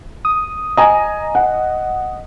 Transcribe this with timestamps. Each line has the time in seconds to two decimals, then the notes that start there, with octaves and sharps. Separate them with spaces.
0.25 D#6
0.77 D#5 G#5 A#5
1.35 F#5